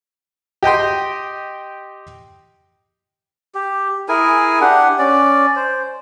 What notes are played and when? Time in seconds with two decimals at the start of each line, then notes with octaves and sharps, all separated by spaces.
0.63 G4 D#5 G5 C6
3.55 G4
4.09 E4 G#4 A#4 G#5
4.61 D4 G4 F#5
4.99 C#4 D5
5.56 C5